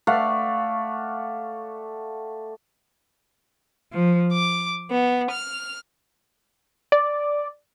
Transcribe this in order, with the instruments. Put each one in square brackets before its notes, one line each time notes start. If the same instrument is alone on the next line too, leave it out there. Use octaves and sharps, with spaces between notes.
[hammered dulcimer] A3 D5 F5 F#5
[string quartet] F3
D6
B3
F6
[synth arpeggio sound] D5